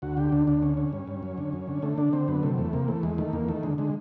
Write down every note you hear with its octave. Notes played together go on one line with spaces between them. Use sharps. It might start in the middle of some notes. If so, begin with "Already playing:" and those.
D2 F#4
D3 G4
D2 D4
D2 D4
D3 C#4
D3
G2
G2
F#2
D3
F#2
D3
D3 A3
D3 D4
D3 C4
F#2 B3
C3 A3
E2 A3
C3 A#3
E3 A3
E2 G#3
D#3 A3
E2 A#3
D#3 A3
D3 G#3
D3 G#3